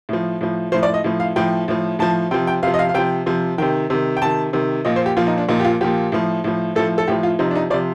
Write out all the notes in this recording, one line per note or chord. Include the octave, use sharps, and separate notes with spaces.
A2 F3
A2 F3
A2 F3 C5
D5
D#5
A2 F3
F5
A2 F3 G5
A2 F3
A2 F3 A5
C3 F3 G5
G5
C3 F3 F5
D#5
F5
F5
C3 F3 G5
C3 F3
C3 D#3 G5
C3 D#3
G5
C3 D#3 A5
C3 D#3
A#2 F3 D#5
C5
G4
A#2 F3 F4
D#4
D4
A#2 F3 D#4
G4
F4
A#2 F3 G4
A2 F3
A2 F3
A2 F3 A4
A4
A2 F3 G4
F4
C3 F3 D#4
D4
D#4
C3 F3 D5